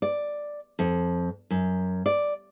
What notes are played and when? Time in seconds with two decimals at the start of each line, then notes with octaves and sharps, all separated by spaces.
0.02 D5
0.79 F2
1.51 F#2
2.06 D5